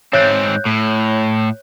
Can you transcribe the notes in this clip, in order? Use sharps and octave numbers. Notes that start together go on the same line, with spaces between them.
G#2 C4 C#5 F#6 G6
A2